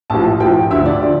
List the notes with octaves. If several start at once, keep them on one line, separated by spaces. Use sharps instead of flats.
A#1 A2 F3 A5
A#1 A2 F3 G5
D2 D3 F3 E5
D5
D3 F3